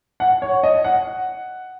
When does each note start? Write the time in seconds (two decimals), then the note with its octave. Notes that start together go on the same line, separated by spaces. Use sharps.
0.20 F#5
0.42 C#5
0.63 D#5
0.84 F#5